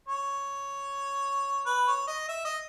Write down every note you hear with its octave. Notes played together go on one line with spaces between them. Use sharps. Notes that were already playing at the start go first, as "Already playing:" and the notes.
C#5
B4
C#5
D#5
E5
D#5